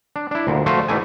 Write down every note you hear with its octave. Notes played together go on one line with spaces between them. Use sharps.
D4
D4 E4
D2 A#2
F3 A3 F4 F#4 C5
G#2 E3 G3 A3 G#5